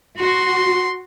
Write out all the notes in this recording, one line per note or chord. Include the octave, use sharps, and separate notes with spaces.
F#4 C6